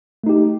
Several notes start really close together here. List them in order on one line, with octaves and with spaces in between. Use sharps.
A3 D#4 G4